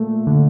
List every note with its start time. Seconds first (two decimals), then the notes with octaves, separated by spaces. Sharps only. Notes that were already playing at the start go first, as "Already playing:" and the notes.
Already playing: A#2 A3
0.27 D3